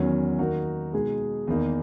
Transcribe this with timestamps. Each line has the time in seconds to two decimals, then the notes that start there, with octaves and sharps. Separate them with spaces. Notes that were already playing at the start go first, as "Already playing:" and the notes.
Already playing: E2 D#3 F#3 C#4
0.39 D#3 A#3 D#4 F#4 A#4
0.93 B2 G#3 D#4 G#4
1.48 E2 D#3 A#3 D#4